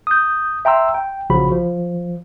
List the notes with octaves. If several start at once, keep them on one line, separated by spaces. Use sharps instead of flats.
D#6 G6
E5 G5 A#5 C6 E6
G5
A#1 C#3 F3 F#4 B5
F3